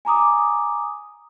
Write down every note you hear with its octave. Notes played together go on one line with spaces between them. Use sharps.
G#5 A#5 D6 D#6